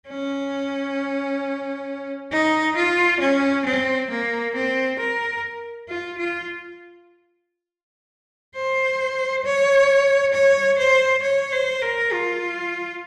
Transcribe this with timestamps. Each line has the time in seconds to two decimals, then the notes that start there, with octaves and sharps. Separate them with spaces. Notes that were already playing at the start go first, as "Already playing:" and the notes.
0.09 C#4
2.32 D#4
2.76 F4
3.20 C#4
3.65 C4
4.10 A#3
4.54 C4
4.99 A#4
5.88 F4
6.17 F4
8.55 C5
9.45 C#5
10.33 C#5
10.78 C5
11.22 C#5
11.52 C5
11.82 A#4
12.12 F4